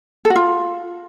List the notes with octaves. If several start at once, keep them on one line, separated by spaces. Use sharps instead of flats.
A4
F#4
F4